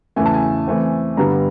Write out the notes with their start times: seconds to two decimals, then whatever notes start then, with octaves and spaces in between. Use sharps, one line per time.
0.16 E2 C#3 E3 A3 G#5
0.26 A5
0.34 G#5
0.67 E3 A3 C4
1.17 G2 D3 G3 B3 A#5